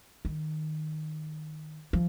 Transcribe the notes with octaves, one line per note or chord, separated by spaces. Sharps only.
D#3
F3